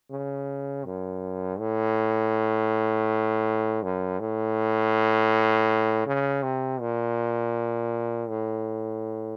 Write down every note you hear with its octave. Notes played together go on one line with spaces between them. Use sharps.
C#3
F#2
A2
F#2
A2
C#3
C3
A#2
A2